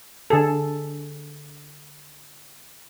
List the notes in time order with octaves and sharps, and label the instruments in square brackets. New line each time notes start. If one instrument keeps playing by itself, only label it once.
[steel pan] D3 G#4 A4